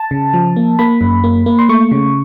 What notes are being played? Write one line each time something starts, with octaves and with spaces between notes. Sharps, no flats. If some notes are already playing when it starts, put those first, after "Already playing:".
Already playing: A5
C#3
F3
A#3
A#3 B5
F#2
A#3
A#3
C6
A3 C#6
C#3